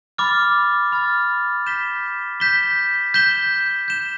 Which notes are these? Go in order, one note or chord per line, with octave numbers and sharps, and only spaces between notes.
B5 D6 F6 A6
B5 D6 F6 A6
G6 B6 E7 G7
G6 B6 E7 G7
G6 B6 E7 G7
G6 B6 E7 G7